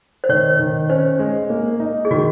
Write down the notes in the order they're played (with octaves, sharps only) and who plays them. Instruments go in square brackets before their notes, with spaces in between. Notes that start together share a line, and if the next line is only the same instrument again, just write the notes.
[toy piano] C5
[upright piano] D#3 [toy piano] C#5
[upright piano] D#3
[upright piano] C#4 [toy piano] C5
[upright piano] G#3
A#3
D#4
[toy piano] G#4
[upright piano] D#3 [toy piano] F#4